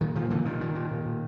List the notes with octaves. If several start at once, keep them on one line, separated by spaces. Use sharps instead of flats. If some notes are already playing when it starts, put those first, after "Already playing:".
A#2 D#3
A#2 D#3 F3
A#2 D3 E3
A#2 D#3
A#2
A#2
A#2
A#2